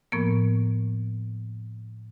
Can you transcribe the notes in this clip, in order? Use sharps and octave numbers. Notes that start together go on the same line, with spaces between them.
A2 F3 A#3 B3 A#4